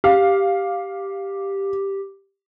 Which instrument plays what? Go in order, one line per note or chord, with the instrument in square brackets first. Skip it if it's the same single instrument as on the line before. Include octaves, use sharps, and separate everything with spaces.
[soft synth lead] G4 [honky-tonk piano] F5